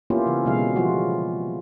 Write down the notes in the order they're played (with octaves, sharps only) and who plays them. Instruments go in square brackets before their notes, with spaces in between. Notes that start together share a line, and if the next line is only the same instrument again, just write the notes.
[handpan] A#3 B3 C#4 E4 F4 G4
C#3 E3 C4
B2 D3 F#3 G#3 F5
E3 F3 G3 F4 F#4